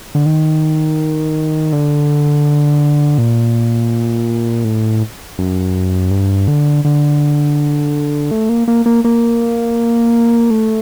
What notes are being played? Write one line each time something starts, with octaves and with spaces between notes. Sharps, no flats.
D3
D#3
D3
A#2
A2
F#2
G2
D3
D3
A3
A#3
A#3
A#3
A#3
A3